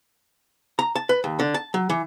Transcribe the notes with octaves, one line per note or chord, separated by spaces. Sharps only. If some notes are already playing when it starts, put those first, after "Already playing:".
A#5
A5
B4
D#2
D3
A5
F#3
E3